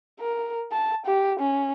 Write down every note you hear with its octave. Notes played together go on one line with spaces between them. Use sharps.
A#4
A5
G4
C#4